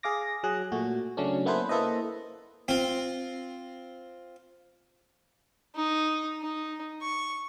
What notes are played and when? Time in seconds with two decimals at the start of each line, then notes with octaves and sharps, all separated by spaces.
0.03 G#4 F5 D6 A#6
0.43 F#3 G#4 F#6
0.72 A#2 A3 F#4
1.17 C#3 F#3 A3 C#4 D4
1.45 A#3 B3 E4 A4 B4 C5
1.69 A#3 E4 A4 B4 C5 D#5
2.68 C4 F4
5.75 D#4
6.42 D#4
7.02 C#6